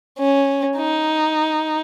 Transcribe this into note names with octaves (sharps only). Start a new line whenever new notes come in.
C#4
D#4